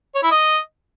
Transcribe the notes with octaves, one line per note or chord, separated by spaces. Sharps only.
C#5
E4
D#5